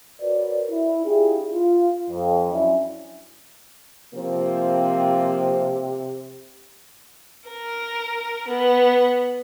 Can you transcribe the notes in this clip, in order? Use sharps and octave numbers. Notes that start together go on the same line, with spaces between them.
F#4 A#4 B4 C#5 D5
E4
D4 E4 F4 G4 G#4
F4
F2
F#3 C#4 D4 E4
C3 F3 A#3 C4
A#4
B3